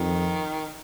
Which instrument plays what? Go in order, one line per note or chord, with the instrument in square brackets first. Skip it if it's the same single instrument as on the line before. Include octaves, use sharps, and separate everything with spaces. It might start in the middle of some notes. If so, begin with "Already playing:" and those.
Already playing: [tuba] F2 [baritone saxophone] D#3